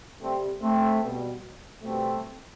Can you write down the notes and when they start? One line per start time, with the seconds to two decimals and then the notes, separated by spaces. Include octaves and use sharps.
0.21 C3 G3 A3 C4
0.61 A3 C4
1.02 B2 G3
1.83 B2 G3 A3 C4